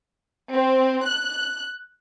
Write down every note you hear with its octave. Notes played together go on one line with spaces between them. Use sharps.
C4
F#6